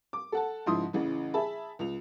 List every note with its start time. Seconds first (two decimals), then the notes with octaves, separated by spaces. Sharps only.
0.13 D6
0.32 A4 F#5 A5
0.66 G#2 C#3 F3 E4 C6 D#6
0.93 A1 C#3 E3
1.34 G#4 E5 A5 B5
1.79 C#2 F7